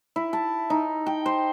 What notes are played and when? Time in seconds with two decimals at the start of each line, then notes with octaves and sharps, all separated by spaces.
0.16 E4
0.33 A5
0.70 D#4
1.06 G5
1.26 C5